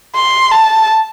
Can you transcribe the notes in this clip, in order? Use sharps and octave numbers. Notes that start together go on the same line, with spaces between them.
C6
A5